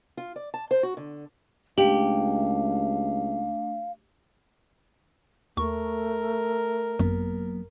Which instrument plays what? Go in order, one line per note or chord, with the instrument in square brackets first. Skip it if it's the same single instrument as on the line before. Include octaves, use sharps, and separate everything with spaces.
[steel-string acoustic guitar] F4
D5
A5
C5
F#4
D3
[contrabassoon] C#2 [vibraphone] A3 D4 [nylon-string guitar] G4 [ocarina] F5
[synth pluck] D#2 C#6 [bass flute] A3 [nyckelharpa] A#4
[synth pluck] G#1 F#2 [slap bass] F#3 A#3 B3